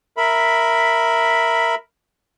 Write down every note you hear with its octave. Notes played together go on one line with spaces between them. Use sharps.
A#4 E5 B5